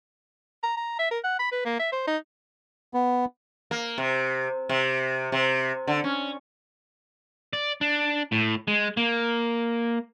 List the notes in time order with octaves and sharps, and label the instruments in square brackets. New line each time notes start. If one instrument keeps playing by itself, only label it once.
[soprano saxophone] A#5
A#5
E5
A#4
F#5
B5
B4
A#3
E5
C5
D#4
[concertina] B3
[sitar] A#3
C3
C3
C3
D3
C#4
[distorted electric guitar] D5
D4
A2
G#3
A#3